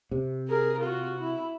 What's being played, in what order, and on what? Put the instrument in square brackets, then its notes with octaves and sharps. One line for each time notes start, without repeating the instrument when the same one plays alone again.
[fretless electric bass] C3
[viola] G#4 A#4
F4 F#4
E4